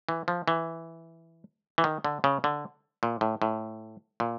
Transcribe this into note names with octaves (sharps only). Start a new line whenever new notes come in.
E3
F3
E3
E3
D#3
D3
C#3
D3
A#2
A2
A2
A#2